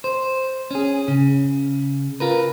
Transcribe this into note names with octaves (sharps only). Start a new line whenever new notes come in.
C5
C#4 G#4
C#3
F4 A#4 B4